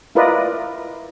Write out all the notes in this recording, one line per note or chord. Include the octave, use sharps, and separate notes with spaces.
E4 F4 A#4 B4 D5 D#5